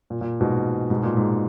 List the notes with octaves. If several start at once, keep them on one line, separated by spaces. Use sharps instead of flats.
A#2
A#2
G#2 B2
G#2 B2
A#2
G#2